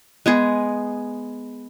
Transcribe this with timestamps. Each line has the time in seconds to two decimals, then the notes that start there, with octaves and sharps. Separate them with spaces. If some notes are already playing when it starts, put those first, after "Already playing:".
0.26 G#3 B3 G#4